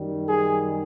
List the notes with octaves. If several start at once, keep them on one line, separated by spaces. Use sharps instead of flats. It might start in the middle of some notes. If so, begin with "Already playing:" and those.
Already playing: F#2 D#3 G3
G#4